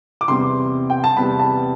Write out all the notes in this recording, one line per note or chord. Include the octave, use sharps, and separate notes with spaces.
D6
E2 C3 G3 B3 C6
G5
A5
E2 C3 G3 B3 B5
A5